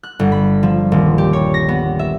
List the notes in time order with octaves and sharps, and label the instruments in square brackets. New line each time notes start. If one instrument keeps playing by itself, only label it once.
[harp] F#6
G1
B5
F3
D#1
G4
C#5
A#6
B3
E5